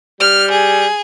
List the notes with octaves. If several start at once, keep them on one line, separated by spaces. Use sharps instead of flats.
G3 F6
G#4